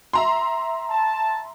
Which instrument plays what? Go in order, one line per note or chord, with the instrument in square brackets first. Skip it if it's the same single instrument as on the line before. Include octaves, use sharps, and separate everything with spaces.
[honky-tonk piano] E5 A#5 C6
[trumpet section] A5